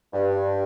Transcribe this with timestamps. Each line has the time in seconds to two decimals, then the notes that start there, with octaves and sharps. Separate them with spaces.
0.13 G2